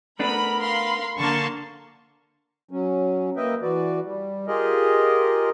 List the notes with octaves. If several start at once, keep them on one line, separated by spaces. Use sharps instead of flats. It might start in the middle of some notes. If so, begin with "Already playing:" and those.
A3 B3 D4 A#4 B5
F5 B5 C6
D3 A#3 A5 C6 C#6
F#3 C#4
A#3 B4 D#5 E5 G5
E3 F#4 B4 D5
G3
F4 G4 G#4 A#4 D#5